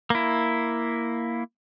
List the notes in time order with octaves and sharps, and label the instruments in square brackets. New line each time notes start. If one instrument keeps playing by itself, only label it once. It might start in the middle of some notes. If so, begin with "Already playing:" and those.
[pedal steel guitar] A#3 E4